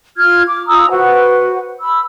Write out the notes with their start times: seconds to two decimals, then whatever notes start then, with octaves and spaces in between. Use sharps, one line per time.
0.17 F4 F6 G#6
0.48 D6
0.68 F4 A#5 D#6 E6
0.90 F#4 B4 C5 F#5
1.81 B5 E6